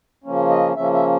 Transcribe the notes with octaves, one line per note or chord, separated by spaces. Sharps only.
C#3 F3 A#3 C#4
D#5
C#3 F3 A#3 C#4 E5
E5